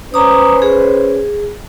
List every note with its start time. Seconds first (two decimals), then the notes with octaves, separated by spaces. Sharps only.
0.14 C#4 B4 C5 A#5 D6 D#6
0.62 G#4